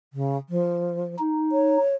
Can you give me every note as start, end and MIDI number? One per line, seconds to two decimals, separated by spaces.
0.13 0.37 49
0.49 1.15 53
1.19 1.78 63
1.52 1.96 73